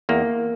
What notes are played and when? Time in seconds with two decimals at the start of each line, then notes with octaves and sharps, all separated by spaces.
0.09 E2 A#3